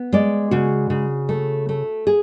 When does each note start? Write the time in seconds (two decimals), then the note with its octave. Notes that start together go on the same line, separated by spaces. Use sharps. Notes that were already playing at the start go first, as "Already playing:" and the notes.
Already playing: B3
0.13 G#3 D5
0.51 C#3 F#4
0.90 C#3
1.29 A3
1.69 A3
2.07 G#4